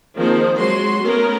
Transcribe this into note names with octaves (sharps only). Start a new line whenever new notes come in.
D#3 F3 A#3 C4 G#4 C5
F#3 G#3 F#4 C6
A3 B3 C#4 A#4